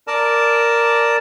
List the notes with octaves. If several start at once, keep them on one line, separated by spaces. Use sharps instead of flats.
A#4 D5 A5